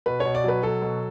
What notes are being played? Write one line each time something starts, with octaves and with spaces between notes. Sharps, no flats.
B2 B4
C#5
B2
D5
F#3 B4
F#3 A4
B2